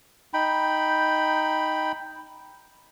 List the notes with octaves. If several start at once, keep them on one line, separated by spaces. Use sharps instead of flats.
D#4 G5 B5